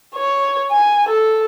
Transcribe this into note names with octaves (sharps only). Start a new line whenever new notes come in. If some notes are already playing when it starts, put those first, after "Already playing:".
C#5
G#5
A4